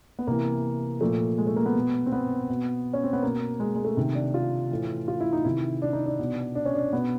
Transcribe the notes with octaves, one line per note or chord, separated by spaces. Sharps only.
B3
C3 E3 A#3
A#2 F3 A3
G#3
A3
A#3
B3
B2
C4
B3
B2
C#4
C4
B3
B2 A#3
G#3
G#3
A3
C3 D#3
D4
F4
A2 E3
F4
E4
D#4
C3 D#3 E4
D4
D#4
D4
B2
D4
C#4
D4
B2 B3